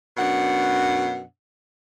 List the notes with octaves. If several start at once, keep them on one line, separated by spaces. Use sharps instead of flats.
F#2 B2 D4 F#5